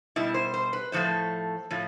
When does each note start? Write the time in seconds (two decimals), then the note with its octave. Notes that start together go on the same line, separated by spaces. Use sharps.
0.16 B2 G3 E4
0.34 C5
0.54 C5
0.73 B4
0.92 A2 F3 A3 C5
1.71 A2 F3